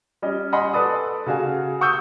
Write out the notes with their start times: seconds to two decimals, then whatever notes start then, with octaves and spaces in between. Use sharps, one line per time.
0.22 G3 C#4 D#5
0.53 D#5 F#5 G#5 B5 C6
0.73 A4 B4 D5 D#6
1.26 C#3 F#4 F5 G#5
1.81 F#5 C#6 D#6 E6 G6